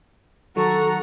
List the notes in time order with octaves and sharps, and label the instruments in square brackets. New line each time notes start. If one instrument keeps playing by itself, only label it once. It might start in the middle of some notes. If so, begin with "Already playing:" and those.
[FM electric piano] D#3 F#3 [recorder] A4 [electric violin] F#5 A#5 [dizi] C#6